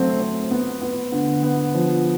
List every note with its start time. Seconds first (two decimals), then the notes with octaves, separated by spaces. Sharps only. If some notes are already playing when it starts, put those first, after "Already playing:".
Already playing: F#3 A3 C4
0.20 C4
0.51 B3
0.81 B3
1.12 D3
1.43 B3
1.74 F3